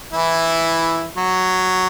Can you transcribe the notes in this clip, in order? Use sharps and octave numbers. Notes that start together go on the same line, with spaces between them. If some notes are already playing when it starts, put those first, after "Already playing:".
E3 E4
F#3 F#4